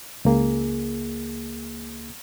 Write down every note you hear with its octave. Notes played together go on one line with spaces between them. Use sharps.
C#2 A#3 G#4